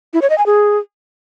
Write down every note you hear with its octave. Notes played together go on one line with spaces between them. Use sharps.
E4
C#5
D#5
G#5
G#4